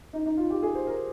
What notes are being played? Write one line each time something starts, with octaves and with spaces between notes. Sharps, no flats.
D#4
D#4
F4
G4
G#4
C5
A#4